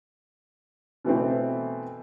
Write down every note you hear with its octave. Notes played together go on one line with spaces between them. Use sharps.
B2 E3 A3 C4